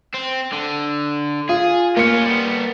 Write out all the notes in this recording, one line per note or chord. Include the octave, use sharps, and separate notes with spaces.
C4
D3
F4 G#4
A#3 C#4 F4 C#7
G3 B3